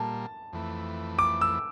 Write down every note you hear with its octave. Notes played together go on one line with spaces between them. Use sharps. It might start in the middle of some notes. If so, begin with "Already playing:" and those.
Already playing: A#2 G3 A#3 A5
F2 E3 A3
D6
E6